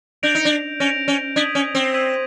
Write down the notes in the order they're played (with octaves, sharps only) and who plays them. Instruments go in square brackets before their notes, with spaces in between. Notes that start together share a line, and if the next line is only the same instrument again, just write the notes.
[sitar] D4 [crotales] G6 A#6 D7 F7
[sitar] D#4
D4
[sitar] C#4 [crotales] G6 A#6 D7 F7
[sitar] C#4
[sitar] D4 [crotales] D#6 G#6 B6 D#7 F#7
[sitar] C#4
C4
[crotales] D#6 G#6 B6 D#7 F#7